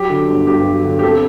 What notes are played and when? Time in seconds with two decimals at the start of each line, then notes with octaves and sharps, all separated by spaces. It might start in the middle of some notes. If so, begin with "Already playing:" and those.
Already playing: F#3 G4
0.10 D3
0.28 G1
0.47 G2 G4
0.66 F#3
0.84 D3
0.99 G4
1.02 C4 A4